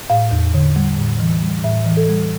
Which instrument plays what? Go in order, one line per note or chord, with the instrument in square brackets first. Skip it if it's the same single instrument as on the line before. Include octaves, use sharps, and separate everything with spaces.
[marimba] A2 F5
E2
D3
G3
A2
E3
G3
A2 E5
E3
A4
G3